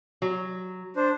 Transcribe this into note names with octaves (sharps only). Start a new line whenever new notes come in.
F#3
D4 C5